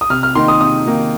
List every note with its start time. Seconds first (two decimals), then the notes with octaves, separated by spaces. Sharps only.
0.01 D#6
0.10 C3 F6
0.23 F6
0.35 D#3 A#3 D#4 C6
0.48 D#6
0.61 C3 D#6
0.87 D#3 A#3 D#4